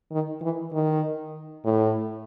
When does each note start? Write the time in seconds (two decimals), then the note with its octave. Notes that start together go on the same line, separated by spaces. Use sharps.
0.12 D#3
0.41 E3
0.73 D#3
1.65 A2